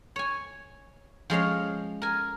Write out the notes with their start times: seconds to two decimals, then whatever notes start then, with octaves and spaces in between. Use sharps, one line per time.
0.16 C#5 G#5
1.30 F3 G#3 C#4 F5
2.02 A#4 G#5